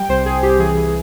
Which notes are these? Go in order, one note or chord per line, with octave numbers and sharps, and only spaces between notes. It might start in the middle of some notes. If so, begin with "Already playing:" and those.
Already playing: G3 G5
C2 C5
C2 G#4
C2 G4
E3 G#4
E3